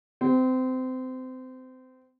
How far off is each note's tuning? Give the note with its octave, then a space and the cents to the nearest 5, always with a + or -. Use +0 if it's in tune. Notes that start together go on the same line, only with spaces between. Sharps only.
C4 -25